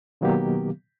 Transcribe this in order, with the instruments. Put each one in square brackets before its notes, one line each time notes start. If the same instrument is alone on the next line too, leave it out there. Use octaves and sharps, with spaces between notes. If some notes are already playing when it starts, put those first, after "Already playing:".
[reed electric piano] B2 D#3 F#3 A#3 B3 G4